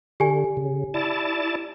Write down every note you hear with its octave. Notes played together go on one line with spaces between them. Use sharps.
D3 G4 G#5
C#3
E4 D5 A5